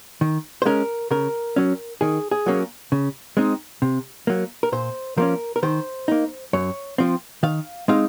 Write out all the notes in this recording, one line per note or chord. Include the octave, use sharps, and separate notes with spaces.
D#3
C5
G#3 C#4 A#4
C#3 A#4
F#3 C#4
D#3 G#4
G#4
F#3 A#3 C#4
C#3
G#3 C4 D#4
C3
F#3 A#3
A#4
A#2 C5
F3 A#3 C#4 A#4
A#4
D#3 C5
A#3 D#4
F#2 C#5
F3 C4
D#3 F5
G#3 C4 D#4 F5